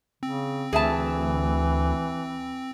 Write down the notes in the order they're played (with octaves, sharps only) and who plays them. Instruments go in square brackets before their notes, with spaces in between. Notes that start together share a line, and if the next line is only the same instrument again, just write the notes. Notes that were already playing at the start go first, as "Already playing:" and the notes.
[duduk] C#3 [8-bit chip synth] C4
[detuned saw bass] D2 [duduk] E3 [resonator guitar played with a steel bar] G#4 E5 A5